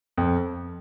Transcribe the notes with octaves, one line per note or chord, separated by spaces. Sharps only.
F2